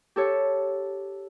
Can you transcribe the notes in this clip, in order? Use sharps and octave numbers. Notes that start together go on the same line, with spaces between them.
G4 A4 C#5